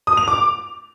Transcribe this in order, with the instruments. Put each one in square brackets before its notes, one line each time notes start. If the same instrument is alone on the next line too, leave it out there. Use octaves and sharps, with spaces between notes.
[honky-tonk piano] D#6
F7
D6